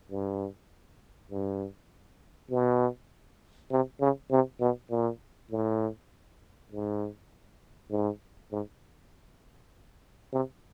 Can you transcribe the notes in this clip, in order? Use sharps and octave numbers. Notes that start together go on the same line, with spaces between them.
G2
G2
B2
C3
C#3
C3
B2
A#2
A2
G#2
G#2
G#2
C3